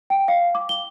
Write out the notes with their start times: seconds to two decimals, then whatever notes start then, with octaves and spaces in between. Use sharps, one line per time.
0.10 G5
0.28 F5
0.55 D6
0.69 G7